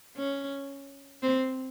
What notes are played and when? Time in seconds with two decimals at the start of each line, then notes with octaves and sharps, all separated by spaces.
0.17 C#4
1.22 C4